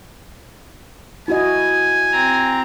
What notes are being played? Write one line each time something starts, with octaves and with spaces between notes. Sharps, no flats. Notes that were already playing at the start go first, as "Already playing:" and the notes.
E4 F#4 D#5 G#5
C4 A#5